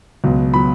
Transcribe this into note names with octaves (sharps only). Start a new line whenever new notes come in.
C#2 B2 F#3
B2 F#3 B5